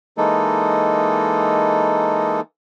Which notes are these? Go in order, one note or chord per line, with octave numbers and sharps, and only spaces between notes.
E3 G#3 A#3 D#4 A4